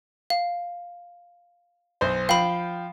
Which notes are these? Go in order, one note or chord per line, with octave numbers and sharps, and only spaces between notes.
F5
B1 C5
F3 F5 G5 B5